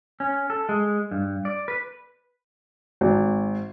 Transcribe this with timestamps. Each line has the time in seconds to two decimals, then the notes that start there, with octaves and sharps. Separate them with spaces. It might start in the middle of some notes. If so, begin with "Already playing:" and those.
0.20 C#4
0.50 A4
0.69 G#3
1.11 G2
1.45 D5
1.68 B4
3.01 G#1